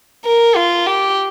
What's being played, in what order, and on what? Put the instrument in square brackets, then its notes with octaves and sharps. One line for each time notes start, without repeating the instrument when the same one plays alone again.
[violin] A#4
F4
G4